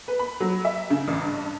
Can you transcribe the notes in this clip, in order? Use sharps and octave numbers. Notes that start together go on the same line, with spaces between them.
B4
B5
F#3
E5
C#3
A1
G2